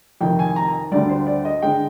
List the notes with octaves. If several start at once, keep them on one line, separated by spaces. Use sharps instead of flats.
F2 C3 D#3 G5
G#5
A#5
D2 D3 G3 D5
C5
D5
D#5
D3 G#3 G5